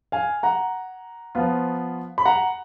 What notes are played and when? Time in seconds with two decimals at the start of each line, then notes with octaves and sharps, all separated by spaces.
0.12 F5 G#5
0.43 F#5 A#5
1.35 F3 B3 F4
2.18 B5
2.25 F#5 A#5